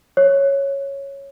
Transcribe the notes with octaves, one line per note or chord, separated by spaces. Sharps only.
C#5